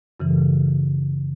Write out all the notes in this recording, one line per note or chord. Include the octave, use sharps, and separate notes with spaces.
F#2 C#3 E3